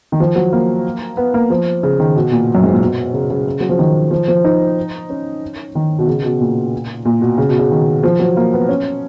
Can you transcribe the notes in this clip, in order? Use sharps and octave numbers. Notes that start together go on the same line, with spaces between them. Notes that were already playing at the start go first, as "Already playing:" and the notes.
D#3
F3
F#3
A#3
B3
A#3
F3
C#3
D#3
B2
A#2
F#2
G#2
A#2
B2
C#3
C#3
F#3
F3
D#3
F3
F3
D#4
C#4
D#3
B2
C#3
B2
A#2
A#2
B2
C#3
B2
C#3
D#3
F3
F#3
A#3
B3
C#4